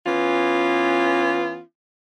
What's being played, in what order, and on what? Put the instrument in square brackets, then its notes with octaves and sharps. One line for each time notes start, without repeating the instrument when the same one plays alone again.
[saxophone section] E3 B3 C#4 F4